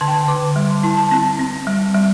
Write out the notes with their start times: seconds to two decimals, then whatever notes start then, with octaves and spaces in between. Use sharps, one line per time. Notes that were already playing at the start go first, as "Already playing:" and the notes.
0.01 D3 A5
0.08 G5
0.14 A5
0.28 D3 D6
0.56 G3
0.70 C6
0.83 E4 A5
0.97 A5
1.11 C4 A5
1.39 C4
1.67 G3
1.95 G3